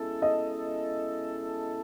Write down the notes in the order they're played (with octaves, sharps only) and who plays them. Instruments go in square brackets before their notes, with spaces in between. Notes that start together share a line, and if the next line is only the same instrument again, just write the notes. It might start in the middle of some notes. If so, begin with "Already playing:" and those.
Already playing: [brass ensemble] B2 G#3 C#4 E4 A4
[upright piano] D#5